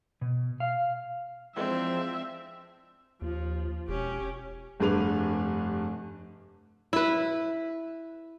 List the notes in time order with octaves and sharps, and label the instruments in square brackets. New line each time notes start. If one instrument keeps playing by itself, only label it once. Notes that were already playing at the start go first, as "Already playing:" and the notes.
[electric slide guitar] B2
F5
[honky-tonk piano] E3 G#3 D4 [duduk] F3 [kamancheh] C4 [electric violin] E5
[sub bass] D#2 [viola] F3
[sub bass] E1 [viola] C#4 G4
[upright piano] F1 G2 D4 G#4 B4 F7
[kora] E4 B4